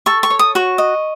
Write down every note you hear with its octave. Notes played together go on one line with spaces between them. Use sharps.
A4 C#6
C#6
C#5
D#6
F#4 C#6
D#5